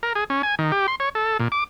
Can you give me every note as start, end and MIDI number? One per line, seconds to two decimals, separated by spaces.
0.03 0.13 70
0.16 0.24 68
0.30 0.42 61
0.43 0.55 80
0.59 0.72 51
0.72 0.87 67
0.88 0.95 84
1.00 1.09 73
1.15 1.37 69
1.40 1.48 46
1.52 1.64 86